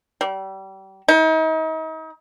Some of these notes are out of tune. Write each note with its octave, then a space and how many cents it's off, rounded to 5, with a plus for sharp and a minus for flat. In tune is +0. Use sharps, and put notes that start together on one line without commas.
G3 -30
D#4 +40